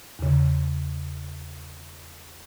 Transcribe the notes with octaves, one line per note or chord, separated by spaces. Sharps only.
E2 C#3